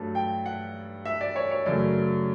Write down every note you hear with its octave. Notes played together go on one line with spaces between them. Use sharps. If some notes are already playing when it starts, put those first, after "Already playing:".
Already playing: G2 F#3 A3 A5
G5
F#5
E5
D5
C#5
C#5
F#2 C#3 F#3 A3 D5